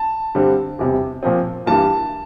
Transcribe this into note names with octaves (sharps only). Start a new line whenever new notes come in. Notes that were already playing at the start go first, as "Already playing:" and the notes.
Already playing: A5
G2 D3 G3 C4
E2 C3 G3
A#2 F3 C4
G2 E3 G3 A#3 A5